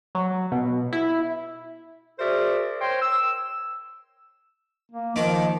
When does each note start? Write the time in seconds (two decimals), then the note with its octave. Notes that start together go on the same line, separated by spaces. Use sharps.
0.15 F#3
0.52 B2
0.93 E4
2.18 F#4 G#4 A#4 C5 D5 E5
2.80 A#4 C5 C#5 G5 C6
3.00 E6
4.92 A#3
5.16 D#3 F3 D6